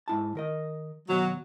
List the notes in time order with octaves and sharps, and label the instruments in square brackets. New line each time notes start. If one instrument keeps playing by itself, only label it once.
[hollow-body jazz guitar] G#2 E4 A5
D#3 A#4 D#5
[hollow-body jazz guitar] D#2 B2 [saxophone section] F#3